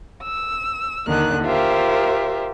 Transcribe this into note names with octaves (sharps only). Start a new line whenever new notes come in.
E6
D#2 D3 D#3 F#6
F4 G4 A#4 C5 E5